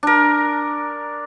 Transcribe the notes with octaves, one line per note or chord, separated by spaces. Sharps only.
D4 A#4